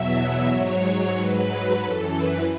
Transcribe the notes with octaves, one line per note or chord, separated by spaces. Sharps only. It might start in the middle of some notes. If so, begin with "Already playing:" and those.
Already playing: E2 B2 F#3 E5
G#2 F#3 C#5
G#2 F#3 B4
F#2 E3 A4
B4